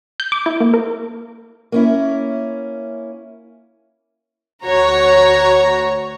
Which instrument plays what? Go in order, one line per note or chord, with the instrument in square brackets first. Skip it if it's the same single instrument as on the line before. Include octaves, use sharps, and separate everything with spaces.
[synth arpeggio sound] G6
D6
E4
A#3
A#4
[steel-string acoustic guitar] A#3 C#4 E4
[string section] D2 F#4 C#5 A#5